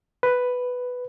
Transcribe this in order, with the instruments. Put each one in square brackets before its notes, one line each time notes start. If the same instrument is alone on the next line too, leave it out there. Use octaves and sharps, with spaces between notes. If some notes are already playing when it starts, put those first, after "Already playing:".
[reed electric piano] B4